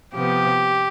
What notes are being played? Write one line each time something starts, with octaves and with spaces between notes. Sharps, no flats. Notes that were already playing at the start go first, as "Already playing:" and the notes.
C3 F3 B3 G4